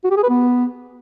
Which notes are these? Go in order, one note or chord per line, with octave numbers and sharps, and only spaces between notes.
F#4
G4
G#4
B4
B3